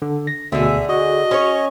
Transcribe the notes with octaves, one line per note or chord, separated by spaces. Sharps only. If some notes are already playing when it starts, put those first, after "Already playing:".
D3
A#6
D2 B2 D3 G#4 E5 E6
F#4 D#5
C#4 C#5